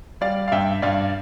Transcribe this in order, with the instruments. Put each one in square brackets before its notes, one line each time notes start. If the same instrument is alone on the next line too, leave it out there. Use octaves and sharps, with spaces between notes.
[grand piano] G3 D5 F5
F5
G2 E5 G5
G2 D5 F5